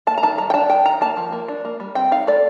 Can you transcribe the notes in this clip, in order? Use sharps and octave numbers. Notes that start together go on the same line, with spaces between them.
A#3 A5
A#5
D#3 A5
G3 A#5
G5
D4 A5
D#3 G5
D#3 A#5
A#3 A5
F3
A#3
D4
A#3
G3
C4 G5
D#4 F5
A3 D5